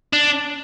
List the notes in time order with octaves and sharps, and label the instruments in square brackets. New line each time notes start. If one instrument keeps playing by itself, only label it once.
[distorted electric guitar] D4